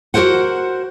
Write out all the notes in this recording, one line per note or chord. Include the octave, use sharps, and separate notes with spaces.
F#4 G4 A#4 C5 F#5